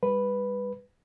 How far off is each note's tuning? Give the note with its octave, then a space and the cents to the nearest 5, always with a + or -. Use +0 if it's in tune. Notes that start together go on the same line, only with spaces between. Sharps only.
G3 +30 B4 +0